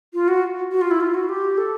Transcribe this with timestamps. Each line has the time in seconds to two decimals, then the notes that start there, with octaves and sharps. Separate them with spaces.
0.14 F4
0.28 F#4
0.71 F#4
0.81 F4
0.91 E4
1.00 F4
1.14 F#4
1.29 G4
1.57 A4